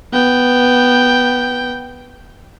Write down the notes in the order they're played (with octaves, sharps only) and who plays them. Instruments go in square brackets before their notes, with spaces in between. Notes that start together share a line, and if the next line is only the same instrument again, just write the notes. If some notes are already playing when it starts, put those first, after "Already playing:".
[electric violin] B3 G5